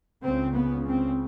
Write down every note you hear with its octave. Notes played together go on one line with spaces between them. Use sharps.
C#2 C#3 C4
B3
C4